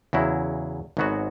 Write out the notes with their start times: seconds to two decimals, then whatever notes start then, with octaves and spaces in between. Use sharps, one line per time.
0.13 E2 C#3 F#3 E4
0.97 G#1 G#2 F#3 B3 F#4